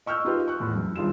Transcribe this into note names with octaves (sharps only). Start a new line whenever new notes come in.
D#5 C#6 E6 F6 G6
D#4 F4 G4 B4
C#6 F#6
E2 A2
F#2
E1 G2 D#3 F4 G#4 E7